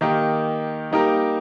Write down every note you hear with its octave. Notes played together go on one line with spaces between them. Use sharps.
D#3 A#3 D#4 G4
G3 A#3 D#4 G4 A#4